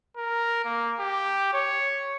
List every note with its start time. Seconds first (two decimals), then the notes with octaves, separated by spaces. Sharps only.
0.17 A#4
0.65 A#3
1.00 G4
1.53 C#5